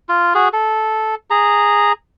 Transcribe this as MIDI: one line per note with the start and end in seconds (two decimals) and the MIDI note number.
0.09 0.34 65
0.35 0.49 66
0.35 0.49 68
0.53 1.15 69
1.30 1.92 68
1.30 1.92 82